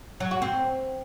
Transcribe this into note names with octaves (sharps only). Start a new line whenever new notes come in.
F#3
F#4
C4